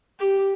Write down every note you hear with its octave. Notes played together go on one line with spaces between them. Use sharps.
G4